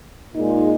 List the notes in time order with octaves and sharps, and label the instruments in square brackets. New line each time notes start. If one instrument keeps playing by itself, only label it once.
[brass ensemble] A#2 G#3 D#4